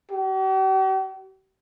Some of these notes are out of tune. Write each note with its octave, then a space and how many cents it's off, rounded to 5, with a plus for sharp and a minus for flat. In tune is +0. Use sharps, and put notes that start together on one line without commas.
G4 -45